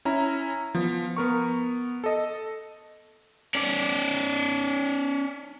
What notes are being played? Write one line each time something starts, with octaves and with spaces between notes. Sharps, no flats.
C#4 E4 A#5
F3 B3
B3 A#4 C#6
A4 D#5
C#4 D5